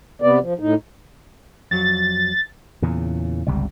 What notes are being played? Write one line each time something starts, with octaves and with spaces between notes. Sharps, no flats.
C3 B3 D5
F3
A2 D#4
F2 F#3 A6
E2 A#2 C#3
G1 C#2 C3 G3